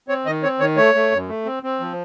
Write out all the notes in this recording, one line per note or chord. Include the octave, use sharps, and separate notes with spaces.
C4 C#5
D#3 D#5
C4 C#5
D#3 C#5
A3 C#5
A3
F#2
A3
C4
C4
F3